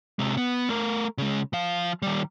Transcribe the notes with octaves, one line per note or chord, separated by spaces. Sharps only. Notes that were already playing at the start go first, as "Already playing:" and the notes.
C3 G#3
B3
A3 A#4
C#3 G#3
F3 F5
D#3 G3